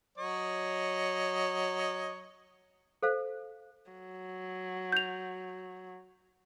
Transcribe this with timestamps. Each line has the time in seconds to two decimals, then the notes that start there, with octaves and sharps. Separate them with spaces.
0.18 F#3 C#5 D#5
3.03 A4 C5 F5
3.91 F#3
4.92 G6 F7